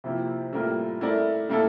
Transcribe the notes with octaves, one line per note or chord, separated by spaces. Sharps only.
C3 F3 A#3 E4 G4
A2 G3 A#3 F4 A#4
A3 E4 A#4 D5
A2 G3 A#3 E4 A4